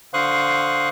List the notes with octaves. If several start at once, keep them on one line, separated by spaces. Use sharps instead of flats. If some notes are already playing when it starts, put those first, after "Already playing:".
D3 C5 F5 C#6 D#6 F#6